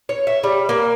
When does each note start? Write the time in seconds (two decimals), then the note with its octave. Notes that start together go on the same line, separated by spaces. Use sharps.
0.09 C#5
0.27 E5
0.44 G3
0.69 A#3